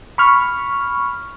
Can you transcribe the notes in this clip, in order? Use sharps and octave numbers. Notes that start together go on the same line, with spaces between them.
B5 C#6 F6